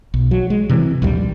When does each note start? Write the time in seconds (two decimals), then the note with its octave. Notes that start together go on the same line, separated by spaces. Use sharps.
0.14 B1
0.31 F#3
0.50 G#3
0.69 C3 E3 F3 C4
1.02 A#1 D#2 G3